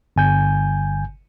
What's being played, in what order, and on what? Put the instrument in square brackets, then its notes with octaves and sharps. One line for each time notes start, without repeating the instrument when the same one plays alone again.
[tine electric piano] G1 G#5 G6